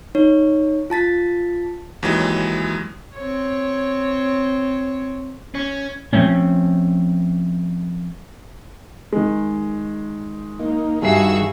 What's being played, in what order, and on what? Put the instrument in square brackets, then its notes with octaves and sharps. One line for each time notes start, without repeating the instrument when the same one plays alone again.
[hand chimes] D#4 C#5
F4 A5 A6 B6
[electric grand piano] D#2 E3 F#3 G#3
[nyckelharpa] C4 C#5
[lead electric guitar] C#4
[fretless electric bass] F3 A3 C4 C#4
[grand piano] D#3 G#3
[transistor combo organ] A#3 D#4
[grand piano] G2 E5 C7 [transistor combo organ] D#3 G3 [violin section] F#4 G#4 E6